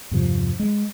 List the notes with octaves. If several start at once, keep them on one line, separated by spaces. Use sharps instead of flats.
E2 G2 C3 F3
G#3